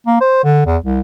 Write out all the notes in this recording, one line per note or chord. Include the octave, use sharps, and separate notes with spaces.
A#3
C5
D3
E2
C2